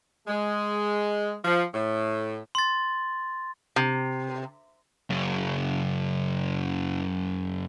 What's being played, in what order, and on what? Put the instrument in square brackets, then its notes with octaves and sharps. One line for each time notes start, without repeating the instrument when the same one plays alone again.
[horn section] G#3
F3
A2
[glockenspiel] C6 A6
[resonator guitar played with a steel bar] C3
[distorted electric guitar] F#2 C#3